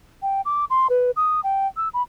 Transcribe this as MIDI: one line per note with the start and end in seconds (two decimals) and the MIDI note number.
0.22 0.41 79
0.45 0.65 86
0.70 0.87 84
0.90 1.11 71
1.16 1.40 87
1.44 1.67 79
1.77 1.89 88
1.94 2.02 83